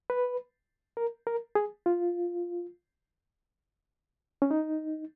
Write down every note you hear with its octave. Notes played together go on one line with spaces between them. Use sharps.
B4
A#4
A#4
G#4
F4
C#4
D#4